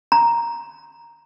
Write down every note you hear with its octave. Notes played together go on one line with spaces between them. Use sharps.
A#5